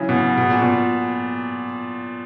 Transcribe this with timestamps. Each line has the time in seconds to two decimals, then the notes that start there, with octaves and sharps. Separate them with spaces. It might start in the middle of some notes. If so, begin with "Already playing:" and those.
Already playing: C#3 E3 F#3
0.09 B2
0.38 B2
0.50 A#2
0.62 B2